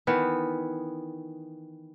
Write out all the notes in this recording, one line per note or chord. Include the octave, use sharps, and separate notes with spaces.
D#3 E3 B3